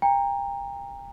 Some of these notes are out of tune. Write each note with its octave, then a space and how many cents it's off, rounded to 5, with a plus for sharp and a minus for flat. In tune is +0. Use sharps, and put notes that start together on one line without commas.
G5 +35 A#5 +0